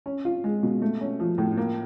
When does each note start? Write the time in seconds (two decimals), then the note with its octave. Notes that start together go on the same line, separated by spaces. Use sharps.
0.06 C#4
0.25 F4
0.44 G#3
0.63 B2
0.82 A3
1.01 C#4
1.20 F3
1.38 A2
1.57 A#3